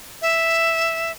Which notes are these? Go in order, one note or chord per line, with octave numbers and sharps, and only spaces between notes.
E5